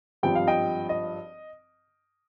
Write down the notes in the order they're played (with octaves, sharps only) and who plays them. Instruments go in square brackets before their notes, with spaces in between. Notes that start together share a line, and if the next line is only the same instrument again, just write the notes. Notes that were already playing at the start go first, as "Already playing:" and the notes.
[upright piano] G#1 G2 F3 G5
F5
D#5 G5
D#5